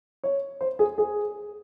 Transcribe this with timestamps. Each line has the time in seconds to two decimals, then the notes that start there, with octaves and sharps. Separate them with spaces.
0.24 C#5
0.61 C5
0.79 G#4
0.98 G#4